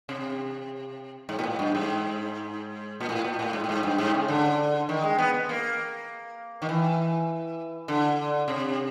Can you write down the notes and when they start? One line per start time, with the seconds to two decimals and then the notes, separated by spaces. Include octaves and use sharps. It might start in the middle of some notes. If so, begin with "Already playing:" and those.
0.09 C3
1.29 G#2
1.39 A#2
1.44 A2
1.59 G2
1.75 G#2
3.00 A#2
3.09 A2
3.24 A#2
3.39 A2
3.53 G#2
3.64 A2
3.69 G#2
3.83 G2
3.98 G#2
4.14 C#3
4.28 D3
4.89 D#3
5.04 G#3
5.18 B3
5.34 B3
5.49 A#3
6.62 D#3
6.69 E3
7.88 D3
8.48 C3